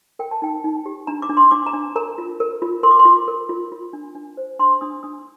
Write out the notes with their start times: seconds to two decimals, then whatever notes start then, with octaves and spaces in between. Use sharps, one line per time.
0.19 A#4 G5
0.31 A5
0.42 D#4 G5
0.64 D#4
0.86 G4
1.07 D4 A#5
1.22 D6
1.29 D4
1.37 C6
1.51 D4 D6
1.66 A#5
1.73 D4
1.96 A#4 A#5
2.18 F4
2.40 A#4
2.62 F4
2.83 A#4 C6
2.91 D6
2.99 C6
3.05 F4
3.28 A#4
3.49 F4
3.72 F4
3.93 D4
4.15 D4
4.37 C5
4.59 D4 C6
4.81 D4 D#6
5.03 D4 D#6